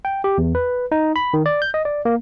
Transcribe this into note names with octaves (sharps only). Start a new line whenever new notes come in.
G5
G4
E2
B4
D#4
B5
D#3
D5
G6
D#5
D5
A#3